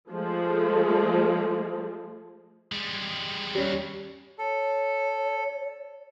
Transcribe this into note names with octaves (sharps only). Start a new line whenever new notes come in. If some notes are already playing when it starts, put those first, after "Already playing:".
F3 G#3 A3
G3 G#3
D#2 G3 C#4
A4 C#5